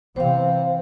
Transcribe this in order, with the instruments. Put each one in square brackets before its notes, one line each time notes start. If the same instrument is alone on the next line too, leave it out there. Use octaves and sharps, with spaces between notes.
[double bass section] C3 E3 C4 [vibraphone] C5 F5